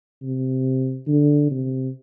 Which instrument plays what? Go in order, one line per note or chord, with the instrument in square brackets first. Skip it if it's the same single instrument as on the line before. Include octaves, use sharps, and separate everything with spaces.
[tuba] C3
D3
C3